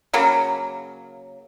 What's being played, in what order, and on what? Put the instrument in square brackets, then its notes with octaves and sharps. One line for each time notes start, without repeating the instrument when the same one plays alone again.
[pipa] C#3 F#3 A#3